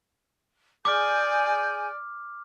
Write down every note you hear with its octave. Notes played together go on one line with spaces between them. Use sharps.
G#4 D5 G#5 D6 F6 G6